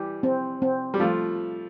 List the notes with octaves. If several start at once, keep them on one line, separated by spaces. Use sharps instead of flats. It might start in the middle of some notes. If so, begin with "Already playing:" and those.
Already playing: E3 G3 G4
C4
C4
G3
F3 A3 F4